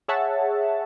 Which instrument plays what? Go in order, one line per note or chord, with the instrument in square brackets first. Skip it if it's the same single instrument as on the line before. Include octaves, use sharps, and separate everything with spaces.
[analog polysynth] G#4 C#5 E5 F#5 A5